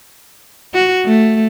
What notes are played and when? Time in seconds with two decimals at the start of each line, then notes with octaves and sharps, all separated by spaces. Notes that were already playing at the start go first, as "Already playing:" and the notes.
0.74 F#4
1.05 A3